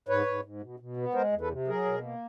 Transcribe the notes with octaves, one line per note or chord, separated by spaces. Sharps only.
G#2 B4 C#5
G#2
G#2
B2
B2
B3
G#3 A#4 C5
E2
A4 B4
C3
F#3 G#4 A#4
B2
A#3